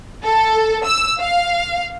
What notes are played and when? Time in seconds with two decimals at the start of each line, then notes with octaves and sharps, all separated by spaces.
0.24 A4
0.84 E6
1.20 F5